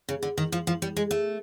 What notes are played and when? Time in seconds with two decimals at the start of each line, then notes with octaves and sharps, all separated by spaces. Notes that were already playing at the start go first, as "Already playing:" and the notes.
0.09 C#3
0.23 D3
0.38 D#3
0.52 F3
0.67 F3
0.82 G3
0.97 G#3
1.11 A3